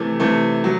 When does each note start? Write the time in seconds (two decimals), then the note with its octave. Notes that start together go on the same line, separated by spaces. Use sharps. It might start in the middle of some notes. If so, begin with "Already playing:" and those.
Already playing: C3 E3 A3
0.20 C3 E3 A3
0.64 F#3